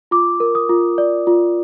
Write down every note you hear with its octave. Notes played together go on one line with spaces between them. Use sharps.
F4 D6
A#4
D#6
F4
D5
F4